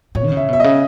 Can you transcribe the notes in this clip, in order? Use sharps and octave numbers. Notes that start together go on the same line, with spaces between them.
A2 C#5
D#3
C#3
E5
B2 E5
C#3 D#5